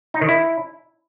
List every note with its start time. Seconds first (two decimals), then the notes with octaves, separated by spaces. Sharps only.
0.14 D#4
0.21 D#3
0.29 E4